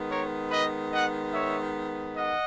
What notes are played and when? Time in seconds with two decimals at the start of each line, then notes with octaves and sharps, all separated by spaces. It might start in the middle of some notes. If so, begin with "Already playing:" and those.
Already playing: D#3 G#3 B3
0.09 A#4 C#5
0.50 B4 D#5
0.92 D#5 F#5
1.33 C#5 E5
2.16 D#5 F#5